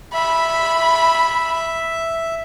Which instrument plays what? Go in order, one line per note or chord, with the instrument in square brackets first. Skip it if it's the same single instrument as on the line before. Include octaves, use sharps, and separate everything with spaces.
[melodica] E5 [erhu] B5